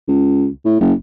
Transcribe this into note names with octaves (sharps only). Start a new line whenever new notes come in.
C#2
A2
F#1